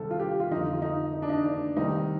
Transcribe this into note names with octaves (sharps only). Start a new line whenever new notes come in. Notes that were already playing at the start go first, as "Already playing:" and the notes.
Already playing: C2 C3 D#3 A4
F4
G4
F4
F2 D3 D#4
F4
D#4
D#4
D4
D#4
D4
C2 C3 D#3 D#4